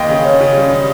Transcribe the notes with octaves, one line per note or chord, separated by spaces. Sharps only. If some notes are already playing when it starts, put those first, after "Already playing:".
Already playing: D#2 D#5 G5
C#3
C#4
C#3
G3
C#3